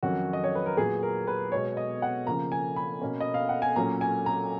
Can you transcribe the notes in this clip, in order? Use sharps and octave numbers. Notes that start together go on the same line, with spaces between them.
F2 D#3 F#3 C#4 F#4
D#5
C#5
B4
A#4
A#2 F#3 B3 G#4
A#4
B4
B2 G#3 B3 C#5
D#5
F#5
C#3 F3 A#3 A#5
G#5
B5
B2 A#3 C#4
D#5
F5
F#5
G#5
A#2 F#3 A#3 C#4 A#5
G#5
A#5